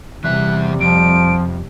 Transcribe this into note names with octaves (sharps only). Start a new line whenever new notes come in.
E2 C3 E3 G3 E5 F#6
F2 F3 D7